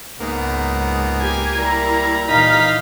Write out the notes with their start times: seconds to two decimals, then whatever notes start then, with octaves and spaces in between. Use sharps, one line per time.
0.20 C#2 G#2 A#3 B3
1.20 G4 G#5
1.58 G3 E4 A#4 A#5
2.29 A#2 E3 D#4 F5 B6